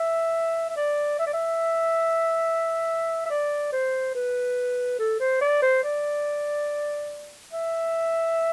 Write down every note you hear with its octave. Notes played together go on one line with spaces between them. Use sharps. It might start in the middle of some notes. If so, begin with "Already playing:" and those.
Already playing: E5
E5
D5
E5
D5
E5
E5
D5
C5
B4
A4
C5
D5
C5
D5
E5